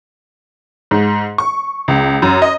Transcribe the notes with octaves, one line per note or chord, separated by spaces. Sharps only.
G#2
C#6
C#2
F#2
D#5